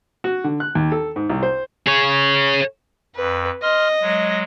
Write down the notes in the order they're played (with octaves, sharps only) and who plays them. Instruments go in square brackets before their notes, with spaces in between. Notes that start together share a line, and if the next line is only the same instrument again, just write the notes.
[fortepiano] F#4
D3
F#6
D#2
A4
G#2
C2
C5
[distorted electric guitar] G#4 C#5
[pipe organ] F2 [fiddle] B4
[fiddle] D#5 [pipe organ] C6 F6
[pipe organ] F#3 G#3